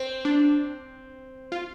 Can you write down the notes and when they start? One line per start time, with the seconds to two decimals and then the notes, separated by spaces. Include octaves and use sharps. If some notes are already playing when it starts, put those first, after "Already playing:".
Already playing: C4
0.25 D4
1.52 F4